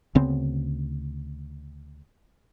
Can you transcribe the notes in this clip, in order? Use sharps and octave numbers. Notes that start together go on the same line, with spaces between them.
D2 C#3 B3 C4